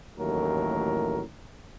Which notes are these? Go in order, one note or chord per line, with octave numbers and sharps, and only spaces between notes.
A1 D#2 A2 F#3 A3 A#4